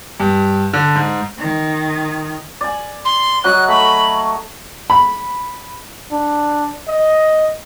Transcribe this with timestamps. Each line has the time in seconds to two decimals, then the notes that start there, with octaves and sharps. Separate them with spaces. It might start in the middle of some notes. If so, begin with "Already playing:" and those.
0.20 G2
0.73 D3
0.96 G#2
1.39 D#3
2.61 D5 G#5
3.05 C6
3.44 F#3 F#4 D#5 F#6
3.68 A3 B5
4.90 B5
6.12 D4
6.89 D#5